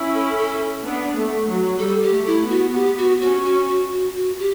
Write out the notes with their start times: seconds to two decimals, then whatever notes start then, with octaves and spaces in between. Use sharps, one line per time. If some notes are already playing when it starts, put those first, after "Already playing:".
Already playing: C#4 E4
0.14 A4
0.38 A4
0.84 B3 D4
1.16 A3
1.48 F#3
1.79 G3 A4
2.03 G4
2.11 A3
2.27 E4
2.43 B3
2.50 F#4
2.73 B3 G4
2.98 F#4
3.21 C#4 F#4
3.45 F#4
3.68 F#4
3.92 F#4
4.15 F#4
4.39 G4